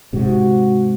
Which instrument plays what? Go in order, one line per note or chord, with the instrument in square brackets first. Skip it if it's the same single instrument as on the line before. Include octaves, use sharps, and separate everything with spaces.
[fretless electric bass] G#2 C3 [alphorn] F#4